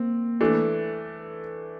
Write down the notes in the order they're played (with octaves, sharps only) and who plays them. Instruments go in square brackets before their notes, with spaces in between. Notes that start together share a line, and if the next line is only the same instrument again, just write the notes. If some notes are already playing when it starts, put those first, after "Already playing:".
Already playing: [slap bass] A#3 [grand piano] C4
[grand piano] E3 A3 D4